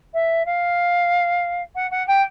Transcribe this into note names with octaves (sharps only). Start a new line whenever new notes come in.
E5
F5
F#5
F#5
G5